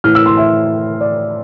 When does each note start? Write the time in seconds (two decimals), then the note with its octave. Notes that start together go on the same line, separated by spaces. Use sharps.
0.04 A2 E3 A3 F6
0.15 E6
0.26 C6
0.37 E5
1.01 D5